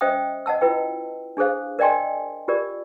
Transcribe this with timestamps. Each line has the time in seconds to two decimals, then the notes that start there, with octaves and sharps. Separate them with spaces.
0.01 C#4 C5 D#5 E5 G5 D#6
0.46 D#5 F#5 A5 E6
0.61 E4 F4 B4 G5
1.37 D4 G#4 A4 C5 F5
1.79 A#4 D5 D#5 G5 G#5 C6
2.48 F4 G4 A#4 D5